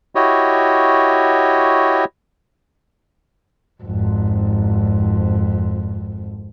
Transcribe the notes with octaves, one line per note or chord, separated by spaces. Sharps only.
E4 F#4 G4 C#5 D#5
G#1 F2